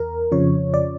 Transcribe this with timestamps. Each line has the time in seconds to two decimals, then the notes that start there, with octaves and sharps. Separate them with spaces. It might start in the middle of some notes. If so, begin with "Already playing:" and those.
Already playing: E2 A#4
0.32 F2 C#3 F3 C#5
0.74 D5